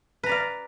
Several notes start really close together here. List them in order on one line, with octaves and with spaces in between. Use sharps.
B4 A#5 D5 F5